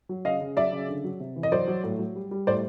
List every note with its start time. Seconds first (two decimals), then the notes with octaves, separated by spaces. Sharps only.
0.09 F#3
0.25 C#3 D#5 F5
0.41 C#3
0.57 F#3 D5 E5
0.72 C#3
0.88 D3
1.04 F#3
1.20 C3
1.36 E3
1.43 D#5
1.52 F#3 C5 D5
1.68 F#3
1.84 A2
1.99 F#3
2.15 G3
2.31 G3
2.47 A2 C5 D5